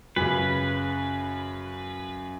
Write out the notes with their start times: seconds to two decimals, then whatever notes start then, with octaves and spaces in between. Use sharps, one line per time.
0.16 F#2 C#3 B4